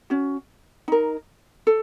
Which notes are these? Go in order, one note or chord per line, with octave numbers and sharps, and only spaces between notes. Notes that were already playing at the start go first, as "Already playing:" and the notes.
C#4 F#4
D#4 A#4
A4